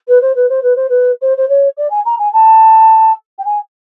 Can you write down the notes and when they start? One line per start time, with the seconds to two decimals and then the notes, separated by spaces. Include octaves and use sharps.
0.08 B4
0.21 C5
0.35 B4
0.49 C5
0.62 B4
0.75 C5
0.89 B4
1.21 C5
1.37 C5
1.48 C#5
1.77 D5
1.90 G#5
2.05 A#5
2.19 G#5
2.33 A5
3.38 G5
3.45 G#5